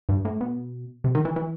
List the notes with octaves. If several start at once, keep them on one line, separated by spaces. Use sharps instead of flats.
G2
A2
B2
C3
D#3
E3
E3